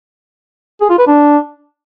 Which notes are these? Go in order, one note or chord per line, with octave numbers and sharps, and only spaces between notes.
G#4
F4
B4
D4